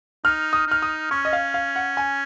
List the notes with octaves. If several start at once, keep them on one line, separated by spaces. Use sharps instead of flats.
D#4 F6
D#6
D#4 F6
D#6
C#4 C#6
D#5
F5
F5
F#5
G#5